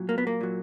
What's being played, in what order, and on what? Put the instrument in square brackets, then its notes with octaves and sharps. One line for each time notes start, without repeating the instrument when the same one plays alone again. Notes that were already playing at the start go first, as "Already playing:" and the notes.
Already playing: [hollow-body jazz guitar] A#2 F#3
A#3
B3
A#3
A#2 F#3